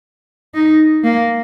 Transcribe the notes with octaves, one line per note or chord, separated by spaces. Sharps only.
D#4
A#3